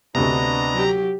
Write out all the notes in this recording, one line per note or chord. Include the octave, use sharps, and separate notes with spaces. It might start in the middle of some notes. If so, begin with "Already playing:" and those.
D2 C3 B3 D4 D#5 A#5
F#3 G4